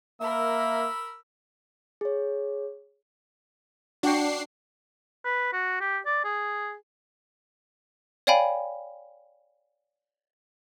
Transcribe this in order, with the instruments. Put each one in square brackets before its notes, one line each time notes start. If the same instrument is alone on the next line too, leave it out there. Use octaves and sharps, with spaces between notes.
[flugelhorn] A#3 [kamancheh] A#4 B5 [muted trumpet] E5 [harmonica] E6
[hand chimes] G#4 C#5
[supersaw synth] D4 C7 [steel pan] F#4 F#5 G5
[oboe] B4
F#4
G4
D5
G#4
[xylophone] C#5 D5 F5 G5 G#5 B5